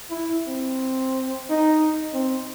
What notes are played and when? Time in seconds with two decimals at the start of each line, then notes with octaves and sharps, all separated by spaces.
0.10 E4
0.47 C4
1.50 D#4
2.13 C4